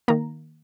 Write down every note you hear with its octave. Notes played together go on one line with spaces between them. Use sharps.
D#3 A#3 A#5